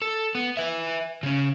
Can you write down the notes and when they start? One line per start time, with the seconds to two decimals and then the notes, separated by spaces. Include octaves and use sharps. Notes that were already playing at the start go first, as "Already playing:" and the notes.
0.02 A4
0.35 B3
0.57 B4 E5
1.23 C#3 C#4